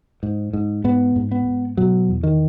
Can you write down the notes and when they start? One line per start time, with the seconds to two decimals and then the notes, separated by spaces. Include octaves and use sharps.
0.23 G#2
0.53 G#2
0.84 G#2 B3
1.16 G#2
1.32 B3
1.46 G#2
1.77 B2 F#3
2.08 E2
2.23 D#3